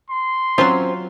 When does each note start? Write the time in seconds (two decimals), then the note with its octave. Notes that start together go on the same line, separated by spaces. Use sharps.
0.10 C6
0.58 F#3 C4 C#4 F4 C5